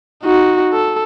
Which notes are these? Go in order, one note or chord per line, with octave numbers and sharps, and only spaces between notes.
D#4 F#4
A4